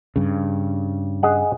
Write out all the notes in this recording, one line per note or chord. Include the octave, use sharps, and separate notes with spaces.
G2 C#3
G#4 D#5 F#5